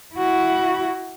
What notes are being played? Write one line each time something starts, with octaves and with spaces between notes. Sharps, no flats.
E4 F#4